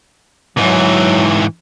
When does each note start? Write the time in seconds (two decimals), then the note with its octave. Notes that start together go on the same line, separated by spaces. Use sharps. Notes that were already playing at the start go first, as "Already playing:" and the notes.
0.57 G#2 E3 F#3